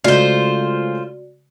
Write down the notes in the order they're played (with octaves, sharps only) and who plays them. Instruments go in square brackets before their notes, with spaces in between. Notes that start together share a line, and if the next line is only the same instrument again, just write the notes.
[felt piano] C#3 G#3 A3 [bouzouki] F4 C5 [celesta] F#4 D5